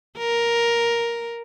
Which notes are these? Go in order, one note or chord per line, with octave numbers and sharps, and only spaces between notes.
A#4